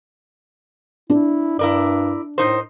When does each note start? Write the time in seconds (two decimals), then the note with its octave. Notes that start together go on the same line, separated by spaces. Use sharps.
1.10 D4 E4
1.59 G2 E4 A#4 D5
2.38 A2 D#4 A#4 C5